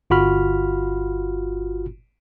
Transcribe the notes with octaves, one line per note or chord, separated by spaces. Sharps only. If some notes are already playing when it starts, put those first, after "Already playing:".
G1 F4 F#4 B5 F6